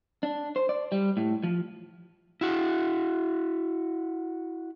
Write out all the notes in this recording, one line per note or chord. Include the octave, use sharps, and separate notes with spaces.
D4
C5
D5
G3
A2
F3
E4 F#4